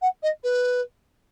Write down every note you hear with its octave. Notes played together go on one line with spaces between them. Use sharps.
F#5
D#5
B4